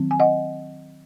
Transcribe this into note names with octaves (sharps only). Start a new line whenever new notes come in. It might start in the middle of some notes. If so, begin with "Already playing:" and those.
Already playing: D#3 F#3 C4
G#5
D#5 F#5